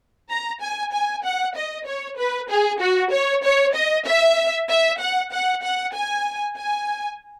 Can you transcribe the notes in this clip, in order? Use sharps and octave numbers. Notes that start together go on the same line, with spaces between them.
A#5
G#5
G#5
F#5
D#5
C#5
B4
G#4
F#4
C#5
C#5
D#5
E5
E5
F#5
F#5
F#5
G#5
G#5